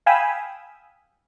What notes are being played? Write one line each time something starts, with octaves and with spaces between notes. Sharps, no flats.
F5 G5 G#5 B5 D#6 E6